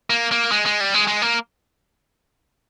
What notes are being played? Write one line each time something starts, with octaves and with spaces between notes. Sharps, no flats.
A#3
A#3
G#3
G#3
G3
G#3
G#3
A#3